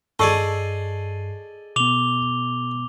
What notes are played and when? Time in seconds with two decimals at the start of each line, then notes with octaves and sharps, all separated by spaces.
0.19 G2 G#4 A4 D5 D#5 A5 C#6 C7
1.76 B2 B3 D6 F7 G7